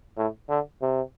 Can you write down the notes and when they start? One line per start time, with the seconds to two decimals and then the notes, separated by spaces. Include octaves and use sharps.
0.17 A2
0.49 D3
0.81 C3